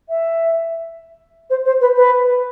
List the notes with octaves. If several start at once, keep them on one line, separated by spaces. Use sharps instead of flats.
E5
C5
C5
B4
B4